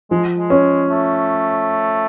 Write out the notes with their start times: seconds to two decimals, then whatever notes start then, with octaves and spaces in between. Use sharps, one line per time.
0.11 F3 G#3
0.38 G#3
0.50 C#4
0.90 A3